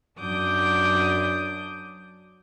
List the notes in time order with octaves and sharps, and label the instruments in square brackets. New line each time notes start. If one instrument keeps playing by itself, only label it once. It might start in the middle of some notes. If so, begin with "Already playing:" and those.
[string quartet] F#2 D4 D6 D#6 G6